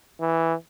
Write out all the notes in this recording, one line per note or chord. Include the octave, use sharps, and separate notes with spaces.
E3